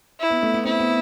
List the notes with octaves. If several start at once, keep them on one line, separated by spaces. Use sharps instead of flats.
E4
B3
A3
B3
C4 E4
B3